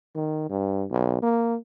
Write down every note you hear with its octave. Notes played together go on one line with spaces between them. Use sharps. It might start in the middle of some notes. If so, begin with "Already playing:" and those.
D#3
G2
B1
A#3